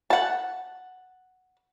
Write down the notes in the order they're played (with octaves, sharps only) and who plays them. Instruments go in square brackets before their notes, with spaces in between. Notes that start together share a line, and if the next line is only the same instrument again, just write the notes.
[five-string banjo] F#5 A5